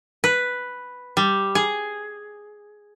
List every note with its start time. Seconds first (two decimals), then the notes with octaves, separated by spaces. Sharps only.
0.24 B4
1.17 G3
1.55 G#4